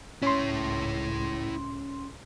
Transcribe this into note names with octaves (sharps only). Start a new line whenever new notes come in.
C#2 A2 C#4 E4 C#5 C6